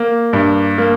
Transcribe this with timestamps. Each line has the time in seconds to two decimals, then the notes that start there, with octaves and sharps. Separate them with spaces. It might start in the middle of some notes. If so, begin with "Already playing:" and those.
Already playing: A#3
0.33 G2
0.78 A#3